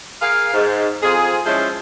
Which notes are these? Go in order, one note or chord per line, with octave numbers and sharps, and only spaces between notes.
G#4 A#4 F5
G#2
F2 C4 F4 G#4
F3 G#3 C#4 E4 C5